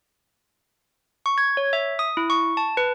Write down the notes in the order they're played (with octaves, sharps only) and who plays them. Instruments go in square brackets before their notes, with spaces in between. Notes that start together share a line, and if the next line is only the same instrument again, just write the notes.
[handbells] C#6
G#6
C#5
E5
D#6
E4
C#6
A5
B4